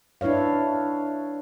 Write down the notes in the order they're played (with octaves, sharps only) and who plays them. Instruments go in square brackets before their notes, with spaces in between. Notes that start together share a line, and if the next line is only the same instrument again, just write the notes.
[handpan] D4 E4 B4 C#5 F5